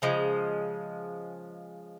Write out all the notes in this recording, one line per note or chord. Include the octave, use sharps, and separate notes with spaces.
C#3 F3 G#3